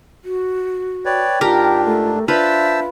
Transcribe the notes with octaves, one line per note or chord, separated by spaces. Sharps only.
F#4
B4 C#5 D5 G5
G#2 D4 F4 G4 A#4
A3
D4 F4 B4 C5 E5 A5 E6